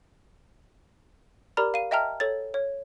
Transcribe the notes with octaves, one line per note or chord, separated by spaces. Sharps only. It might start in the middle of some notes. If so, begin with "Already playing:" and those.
G4 A#4 D5 A#5 B5 F6
F5 D#7
D#5 E5 G5 A5 A#5 F6
A4 C#5 A6
C#5